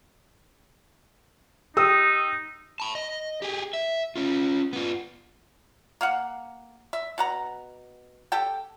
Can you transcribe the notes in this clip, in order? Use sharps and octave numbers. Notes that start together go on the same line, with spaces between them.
D#4 G4 D#6 E6
A5 B5
D#5
G4 G#4
E5
C#4 F4
B3 F4
A#3 F5 F#5
E5
B2 F#5 A#5
G4 A4 G5